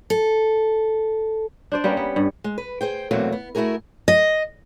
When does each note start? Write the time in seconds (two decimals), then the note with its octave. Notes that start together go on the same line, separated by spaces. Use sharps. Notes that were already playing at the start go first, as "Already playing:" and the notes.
0.10 A4
1.72 D4 C5 D5
1.84 G3 A#3 B3 C#4
1.97 B3
2.16 G2
2.44 G#3
2.58 B4
2.81 G#4 C5 G5
3.11 E2 B2 F#3 A3 A#3 C4
3.32 B3
3.55 A3 E4 F#4 G#4 A#4
4.08 D#5